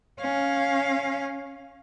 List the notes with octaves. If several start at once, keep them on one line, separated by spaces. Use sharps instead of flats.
C#4 F5